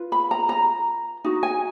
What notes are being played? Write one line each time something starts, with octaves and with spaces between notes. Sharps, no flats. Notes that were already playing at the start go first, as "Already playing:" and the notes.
Already playing: F4 B4
B5
A#5
A#5
D#4 F#4
G#5